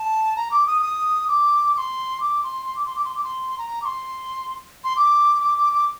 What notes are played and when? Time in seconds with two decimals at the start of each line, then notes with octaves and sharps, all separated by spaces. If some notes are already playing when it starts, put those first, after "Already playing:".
Already playing: A5
0.36 A#5
0.51 D6
0.67 D#6
0.82 D#6
1.28 D6
1.75 D6
1.78 C6
2.20 D6
2.43 C6
2.66 C6
2.76 D6
2.86 C6
2.96 D6
3.05 C6
3.15 D6
3.24 C6
3.58 A#5
3.82 D6
3.85 C6
4.84 C6
4.96 D6
5.42 D6
5.58 D6
5.73 D6